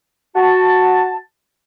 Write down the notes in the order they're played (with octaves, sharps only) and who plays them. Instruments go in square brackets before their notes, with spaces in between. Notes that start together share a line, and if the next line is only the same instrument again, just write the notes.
[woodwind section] F#4 A5